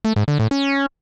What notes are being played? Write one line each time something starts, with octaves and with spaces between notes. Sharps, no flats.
A3
G#2
D3
A2
C#4